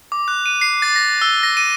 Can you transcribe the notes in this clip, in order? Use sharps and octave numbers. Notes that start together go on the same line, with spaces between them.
D6
F#6
D#7
C7
A6
A#6
E6
A#6
D#7